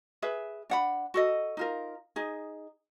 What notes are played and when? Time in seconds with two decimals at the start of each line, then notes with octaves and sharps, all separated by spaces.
0.22 G#4 B4 E5
0.70 D4 F#5 B5
1.14 F#4 A4 D#5
1.57 D#4 F4 A#4
2.16 D#4 G#4